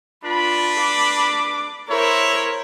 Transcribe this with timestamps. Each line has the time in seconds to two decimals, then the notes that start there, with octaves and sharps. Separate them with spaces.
0.24 D4 F4 B4 B5
0.82 D6
1.89 E4 A#4 C5 C#5